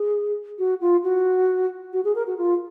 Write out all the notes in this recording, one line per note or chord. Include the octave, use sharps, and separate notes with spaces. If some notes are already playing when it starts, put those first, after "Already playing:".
Already playing: G#4
F#4
F4
F#4
F#4
G#4
A#4
F#4
F4